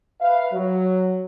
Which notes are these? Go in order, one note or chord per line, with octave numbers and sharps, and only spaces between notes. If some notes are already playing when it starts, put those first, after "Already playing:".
B4 E5 F5
F#3